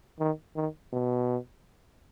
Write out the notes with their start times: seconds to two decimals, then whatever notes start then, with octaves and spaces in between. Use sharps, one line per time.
0.20 D#3
0.56 D#3
0.93 B2